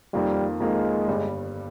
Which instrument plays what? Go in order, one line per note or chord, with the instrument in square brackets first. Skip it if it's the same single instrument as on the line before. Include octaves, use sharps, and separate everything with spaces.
[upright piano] F2 D#3 A#3 F4 [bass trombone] G3
[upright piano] F2 D#3 A#3 F4 [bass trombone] G#3
[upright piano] G1 G2 G3